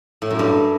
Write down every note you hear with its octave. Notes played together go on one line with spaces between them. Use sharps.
A2
F#2
G2